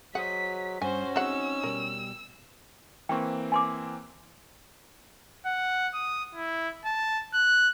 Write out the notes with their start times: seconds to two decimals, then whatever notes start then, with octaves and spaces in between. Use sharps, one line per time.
0.15 F#3 G#4 C5 D#5 F#5 B6
0.82 G2 C#4 F#4 C5 G#5
1.16 F#3 G#3 C4 D#4 F#5 E6
1.63 B2 G3 A#4
3.09 E3 A#3 C4 G5 C#6
3.52 G#5 C6 D6
5.46 F#5
5.94 D#6
6.35 E4
6.85 A5
7.34 F#6